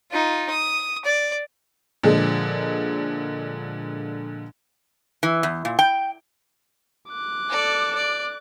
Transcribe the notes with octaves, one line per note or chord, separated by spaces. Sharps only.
D#4 F4
D#6
D5
A#2 D3 F3 G#3
E3
E2
A#2
G5
D6 F#6
A4 D5
D5